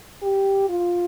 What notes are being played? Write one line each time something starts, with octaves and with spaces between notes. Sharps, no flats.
G4
F4